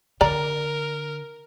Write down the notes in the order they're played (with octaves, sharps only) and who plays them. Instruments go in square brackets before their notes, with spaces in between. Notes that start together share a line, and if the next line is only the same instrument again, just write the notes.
[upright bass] D3 [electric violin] A#4 [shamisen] D5 A#5